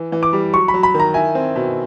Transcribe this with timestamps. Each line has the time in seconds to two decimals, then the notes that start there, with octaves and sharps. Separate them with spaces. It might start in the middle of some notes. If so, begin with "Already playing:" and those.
Already playing: E3
0.12 E3
0.23 D6
0.33 G3
0.53 F#3 C#6
0.68 B5
0.74 F#3
0.83 B5
0.94 D#3
1.00 A#5
1.14 E4 G#5
1.35 C4
1.56 B2